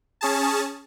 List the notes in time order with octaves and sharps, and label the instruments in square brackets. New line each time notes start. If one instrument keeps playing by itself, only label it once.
[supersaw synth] C#4 G#4 A5